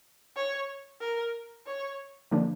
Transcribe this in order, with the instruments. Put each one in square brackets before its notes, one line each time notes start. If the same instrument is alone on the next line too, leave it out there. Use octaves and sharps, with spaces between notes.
[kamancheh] C#5
A#4
C#5
[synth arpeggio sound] D3 F3 A#3 D4